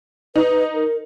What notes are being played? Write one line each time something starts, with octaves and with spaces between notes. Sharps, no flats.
D#4 B4
A#4